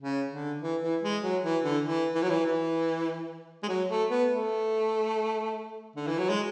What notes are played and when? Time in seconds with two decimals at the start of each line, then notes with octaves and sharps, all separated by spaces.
0.01 C#3
0.31 D3
0.62 E3
0.82 E3
1.03 G#3
1.23 F#3
1.43 E3
1.64 D3
1.85 E3
2.15 E3
2.22 F#3
2.30 E3
2.45 E3
3.63 G#3
3.68 F#3
3.89 A3
4.09 B3
4.30 A3
5.96 D3
6.07 E3
6.18 F#3
6.30 G#3